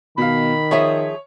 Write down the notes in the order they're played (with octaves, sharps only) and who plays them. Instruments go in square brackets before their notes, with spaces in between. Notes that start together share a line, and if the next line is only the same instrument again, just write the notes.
[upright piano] B2 F5 [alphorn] D#3 [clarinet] B5
[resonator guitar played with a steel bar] F3 G#4 E5 [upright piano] C#5